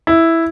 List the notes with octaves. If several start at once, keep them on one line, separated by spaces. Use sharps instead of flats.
E4